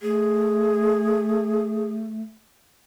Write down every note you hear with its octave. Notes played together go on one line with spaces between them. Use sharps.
A3 G#4